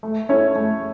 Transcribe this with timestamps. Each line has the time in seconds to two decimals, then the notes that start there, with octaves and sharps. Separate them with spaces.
0.03 A3
0.29 C#4 E4 A4 C#5
0.56 A3